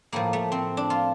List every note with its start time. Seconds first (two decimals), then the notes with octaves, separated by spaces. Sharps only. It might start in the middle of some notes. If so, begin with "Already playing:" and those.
0.12 A2 F3 A#3
0.33 A3
0.52 C4
0.77 D4
0.90 F4